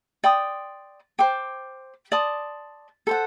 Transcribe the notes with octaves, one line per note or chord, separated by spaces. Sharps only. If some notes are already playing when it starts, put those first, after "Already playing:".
D5 G5 C6 D#6
C5 G5 D6
D5 A5 C6 D#6
A4 C5 F#5